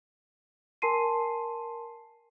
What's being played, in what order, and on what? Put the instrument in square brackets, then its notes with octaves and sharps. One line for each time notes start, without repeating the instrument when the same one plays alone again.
[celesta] A#4 G#5 A5 C6 C7 D#7